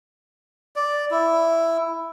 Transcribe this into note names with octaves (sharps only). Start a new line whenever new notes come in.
D5
E4